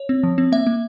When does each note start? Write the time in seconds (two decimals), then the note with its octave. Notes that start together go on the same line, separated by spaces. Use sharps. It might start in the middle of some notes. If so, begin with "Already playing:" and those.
Already playing: C#5
0.09 C4
0.23 F3
0.38 C4
0.52 A#3 E5
0.67 A#3